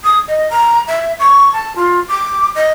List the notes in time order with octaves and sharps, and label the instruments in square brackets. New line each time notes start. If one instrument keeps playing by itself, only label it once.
[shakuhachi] D#6
D#5
A#5
E5
C#6
A5
F4
D6
D#5